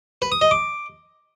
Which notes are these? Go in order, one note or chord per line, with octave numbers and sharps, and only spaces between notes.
B4
D#6
D#5
D6